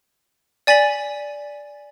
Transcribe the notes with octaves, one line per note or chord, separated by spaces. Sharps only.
D5 G#5 A6 B6 F#7